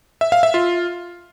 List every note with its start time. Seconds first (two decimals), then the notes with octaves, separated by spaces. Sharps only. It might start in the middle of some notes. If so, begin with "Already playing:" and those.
0.21 E5
0.32 F5
0.43 E5
0.54 F4